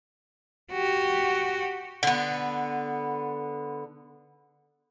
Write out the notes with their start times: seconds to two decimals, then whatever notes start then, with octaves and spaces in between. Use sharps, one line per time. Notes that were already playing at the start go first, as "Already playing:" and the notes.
0.72 F#4 G4
2.03 D3 B3